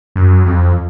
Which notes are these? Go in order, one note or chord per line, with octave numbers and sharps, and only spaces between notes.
F#2
F2